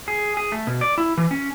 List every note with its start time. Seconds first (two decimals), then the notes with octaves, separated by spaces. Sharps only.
0.08 G#4
0.37 G#4
0.52 A3
0.67 B2
0.81 D5
0.98 E4
1.18 E3
1.31 C#4